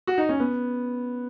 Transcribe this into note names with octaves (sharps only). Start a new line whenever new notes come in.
F#4
D#4
C#4
B3